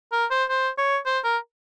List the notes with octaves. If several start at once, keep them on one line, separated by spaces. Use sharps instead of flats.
A#4
C5
C5
C#5
C5
A#4